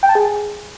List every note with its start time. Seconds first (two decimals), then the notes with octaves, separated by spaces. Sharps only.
0.03 G5
0.09 A5
0.15 G#4